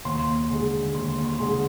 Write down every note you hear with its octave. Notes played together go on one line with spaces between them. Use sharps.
D#2 C6
D3 G#3
D#2 C6
C6
D3 G#3